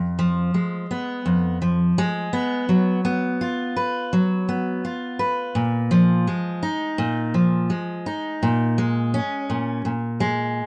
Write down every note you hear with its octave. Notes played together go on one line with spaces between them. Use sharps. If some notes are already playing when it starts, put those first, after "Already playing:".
Already playing: F2
F3
G#3
B3
F2
F3
G#3
B3
F#3
B3
F4
B4
F#3
B3
F4
B4
A#2
F3
G#3
D#4
A#2
F3
G#3
D#4
A#2
G#3
C#4
A#2
A#2
G#3